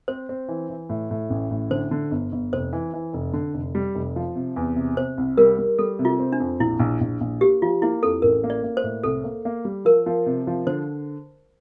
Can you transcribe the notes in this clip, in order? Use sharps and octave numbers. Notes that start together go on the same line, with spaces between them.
C4 C5
C4
E3
E3
A2
A2
A1
A2
D3 C5
D3
G1
G1
F1 C5
E3
E3
F1
D3
F1
G3
F1
F3
C3
E2
C3
C3 C5
C2
G3 A#4
G3
G3 A4
C3
F4
C4
D4
F2
A#1 E4
A#1
A#1
A#1
A#3 G4
F3 F4
A#3 E4
F2 A4
A1 A#4
A#3
D5
A#3
C5
A2
C2 A4
A#3
A#3
G3
F3 A#4
F3
C3
F3
D3 C5